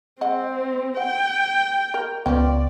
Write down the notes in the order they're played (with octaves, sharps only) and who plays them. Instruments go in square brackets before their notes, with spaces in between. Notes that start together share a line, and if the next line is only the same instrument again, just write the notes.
[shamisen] G#3 D#5 F#5 [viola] C4
[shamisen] F#5 [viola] G5
[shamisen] A#4
[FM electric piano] C#2 B3 [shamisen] F3 C#4 G5 [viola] D5